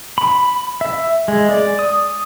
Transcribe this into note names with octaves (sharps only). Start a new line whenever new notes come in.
B5
E5
G#3
D5
D#6